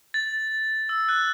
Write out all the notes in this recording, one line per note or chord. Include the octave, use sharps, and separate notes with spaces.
A6
E6
F#6